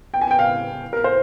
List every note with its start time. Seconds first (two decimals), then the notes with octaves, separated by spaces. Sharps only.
0.14 G5
0.21 G#5
0.31 G5
0.39 F5
0.93 A#4
1.04 C5